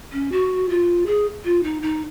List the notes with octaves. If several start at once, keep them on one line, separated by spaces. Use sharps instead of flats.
C#4
F#4
F4
G#4
F4
D#4
D#4